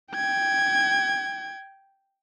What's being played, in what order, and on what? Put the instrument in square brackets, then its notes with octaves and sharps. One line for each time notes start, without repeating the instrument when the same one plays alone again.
[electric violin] G5 G#6